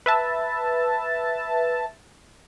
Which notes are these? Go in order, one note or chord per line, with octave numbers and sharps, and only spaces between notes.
B4 E5 A5